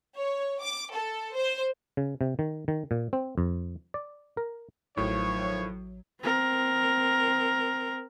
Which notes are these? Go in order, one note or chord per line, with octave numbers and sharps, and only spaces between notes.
C#5
D6
A4
C5
C#3
C3
D#3
D#3
A#2
C4
F2
D5
A#4
A1 A2 D#3 F3 F#3 C#5
C4 A#4